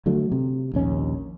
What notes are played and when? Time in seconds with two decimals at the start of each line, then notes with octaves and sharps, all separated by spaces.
0.06 D3 F#3 A3
0.32 C3
0.73 A#1 D#2 C#4